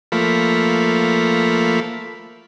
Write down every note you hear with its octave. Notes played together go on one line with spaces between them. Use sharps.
F3 A3 A#3 B5